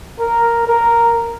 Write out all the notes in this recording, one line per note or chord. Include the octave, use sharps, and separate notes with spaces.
A#4
A#4